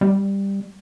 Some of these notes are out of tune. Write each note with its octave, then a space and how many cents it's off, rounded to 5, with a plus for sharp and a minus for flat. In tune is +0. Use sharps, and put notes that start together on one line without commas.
G3 +10